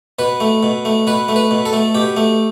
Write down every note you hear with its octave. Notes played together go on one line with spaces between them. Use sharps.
B2 B4
A3
B2
A3
B2 B4
A3
B4
B2
A4
A3
B2 G4
A3